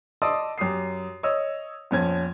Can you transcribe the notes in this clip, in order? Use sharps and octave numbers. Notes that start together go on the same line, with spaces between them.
D5 D#5 A5 C6 D#6 E6
F#2 G4 D#6 C7
C#5 D#5 D#6 E6
A#1 F2 C#4 G#6